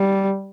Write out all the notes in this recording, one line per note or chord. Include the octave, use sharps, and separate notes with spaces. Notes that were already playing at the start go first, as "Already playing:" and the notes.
Already playing: G3